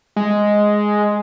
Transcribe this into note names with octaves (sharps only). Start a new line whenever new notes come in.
G#3